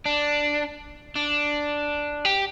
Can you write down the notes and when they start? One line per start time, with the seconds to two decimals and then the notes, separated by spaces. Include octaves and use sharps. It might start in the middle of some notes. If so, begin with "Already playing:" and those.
0.06 D4
1.16 D4
2.25 G4